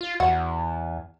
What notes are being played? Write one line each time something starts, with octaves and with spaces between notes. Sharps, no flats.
F4
E2 F#4